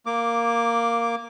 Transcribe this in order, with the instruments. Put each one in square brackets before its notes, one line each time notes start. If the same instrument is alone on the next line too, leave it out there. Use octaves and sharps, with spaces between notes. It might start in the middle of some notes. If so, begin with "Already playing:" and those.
[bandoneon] A#3 D6